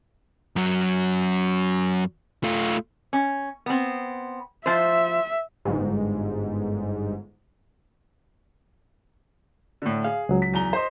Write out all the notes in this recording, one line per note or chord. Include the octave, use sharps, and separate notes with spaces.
F#2 F#3
A3 F4
C#4
B3 C4
F3 C5 E5
G1 G#2
A2 D3
G#4 F5
C#2 F#3
B6
E2 A#5 G7
C5 D#5